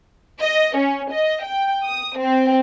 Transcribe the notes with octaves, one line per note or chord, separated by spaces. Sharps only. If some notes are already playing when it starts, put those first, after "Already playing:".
D#5
C#4
D#5
G5
D#6
C4